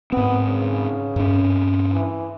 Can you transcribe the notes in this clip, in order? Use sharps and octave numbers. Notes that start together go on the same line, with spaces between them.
G#2 B3 C4
C#3
G2 C#4
E3